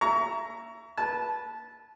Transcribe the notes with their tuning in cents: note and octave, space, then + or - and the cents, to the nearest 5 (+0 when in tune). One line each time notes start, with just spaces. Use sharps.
E5 +25 A#5 +0 C#6 +35
B4 -20 A5 -15